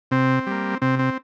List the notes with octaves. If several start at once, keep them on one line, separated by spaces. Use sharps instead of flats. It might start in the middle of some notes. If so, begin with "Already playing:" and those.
C3 C4
G3 A#3
C3 C4
C4